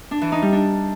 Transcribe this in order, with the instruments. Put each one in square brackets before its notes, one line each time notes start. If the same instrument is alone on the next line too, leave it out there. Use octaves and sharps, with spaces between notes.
[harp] D4
E3
D#4
G3
D4